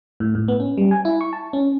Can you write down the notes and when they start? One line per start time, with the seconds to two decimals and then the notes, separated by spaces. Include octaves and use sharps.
0.20 A2
0.35 A2
0.48 B3
0.60 C#4
0.78 G3
0.91 G#5
1.05 E4
1.21 C#6
1.33 A5
1.53 C#4